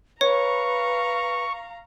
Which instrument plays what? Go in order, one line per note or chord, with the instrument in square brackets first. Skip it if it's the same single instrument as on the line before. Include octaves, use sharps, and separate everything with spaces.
[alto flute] B4 [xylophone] C#5 [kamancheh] F5 A#5 [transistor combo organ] C#6